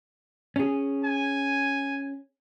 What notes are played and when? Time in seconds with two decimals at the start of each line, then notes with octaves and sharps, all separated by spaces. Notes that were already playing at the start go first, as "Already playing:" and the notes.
0.56 C#4 G#4
1.05 G#5